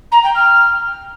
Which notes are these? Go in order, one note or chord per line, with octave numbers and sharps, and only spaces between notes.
A#5
G5
F6